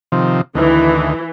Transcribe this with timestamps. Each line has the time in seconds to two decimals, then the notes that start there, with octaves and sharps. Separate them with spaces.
0.12 C3 D#3 F3
0.55 D2 D#3 E3